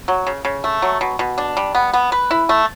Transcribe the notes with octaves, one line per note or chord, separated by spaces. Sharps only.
F#3
C#3
C#3
A3
F#3
B2
B2
D4
G3
B3
B3
B4
E4
A3